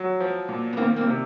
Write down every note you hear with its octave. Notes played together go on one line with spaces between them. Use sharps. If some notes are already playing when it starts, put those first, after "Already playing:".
Already playing: F#3
F3
A#2
B3
D#3 A#3 C4
A#3 C4
C3